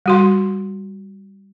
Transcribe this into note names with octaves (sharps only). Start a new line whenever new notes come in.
G3 F#4 C6